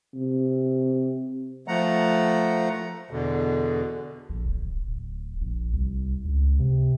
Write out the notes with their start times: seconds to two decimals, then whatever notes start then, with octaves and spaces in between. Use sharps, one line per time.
0.15 C3
1.68 F3 A3 F#5 A#5
3.11 E2 B2 D3
4.29 A#1
4.46 D1
4.87 D1
5.41 A#1
5.73 C2
6.25 C#2
6.59 C3